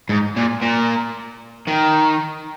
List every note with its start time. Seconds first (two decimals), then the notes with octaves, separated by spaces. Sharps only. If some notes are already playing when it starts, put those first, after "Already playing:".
0.09 G#2
0.36 A#2
0.62 A#2
1.67 D#3